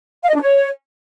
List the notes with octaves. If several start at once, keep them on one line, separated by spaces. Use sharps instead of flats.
F5
D#5
D4
C#5